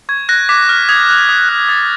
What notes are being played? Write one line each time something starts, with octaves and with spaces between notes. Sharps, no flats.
C#6 G#6
F#6 A#6
D6 B6
F6
D#6 G#6
F#6
D#6
F#6
D#6 A6